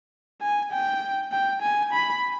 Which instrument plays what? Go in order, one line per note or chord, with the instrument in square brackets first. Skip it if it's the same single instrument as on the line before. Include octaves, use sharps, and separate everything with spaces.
[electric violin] G#5
G5
G5
G#5
B5